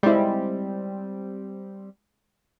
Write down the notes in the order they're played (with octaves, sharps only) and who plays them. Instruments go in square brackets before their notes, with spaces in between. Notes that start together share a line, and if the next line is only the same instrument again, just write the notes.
[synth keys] G3 C4 [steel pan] G#3 E4